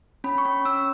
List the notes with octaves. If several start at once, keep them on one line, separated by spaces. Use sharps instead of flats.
C#4 B5
C#6
C#4
C#4 E6